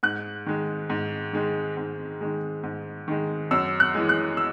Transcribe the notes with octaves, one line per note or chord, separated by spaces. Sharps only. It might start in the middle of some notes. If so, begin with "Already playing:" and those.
G#2 F#6
D#3 G#3
G#2
D#3 G#3
G#2
D#3 G#3
G#2
D#3 G#3
F#2 E6
F#6
E3 G#3
F#6
E6